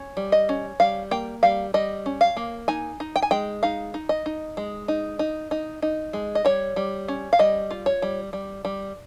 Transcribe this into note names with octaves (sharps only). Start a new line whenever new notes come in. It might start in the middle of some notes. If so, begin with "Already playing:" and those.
Already playing: C#4
G3
D#5
C#4
G3 F5
A#3 G5
G3 F5
G3 D#5
C#4
F5
A#3
D#4 G#5
D#4
G5
G#5
G#3 G5
D#4 F5
D#4
D#5
D#4
G#3
D#4
D#4
D#4
D#4
G#3
D#5
G3 C#5
G3
C#4
F5
G3 D#5
F4
C#5
G3
G3
G3